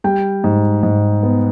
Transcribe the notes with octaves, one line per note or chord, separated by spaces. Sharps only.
G3 G5
G#2
G#2
B3